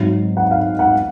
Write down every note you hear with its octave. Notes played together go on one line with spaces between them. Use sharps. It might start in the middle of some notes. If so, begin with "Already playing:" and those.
Already playing: G#1 G#2 F#3
F#5
F5
F#5